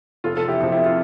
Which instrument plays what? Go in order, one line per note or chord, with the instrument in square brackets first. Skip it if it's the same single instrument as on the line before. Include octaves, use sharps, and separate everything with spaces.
[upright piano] F1 F4 A4
A4
E4 G4
F2 C3
E4 G4
F4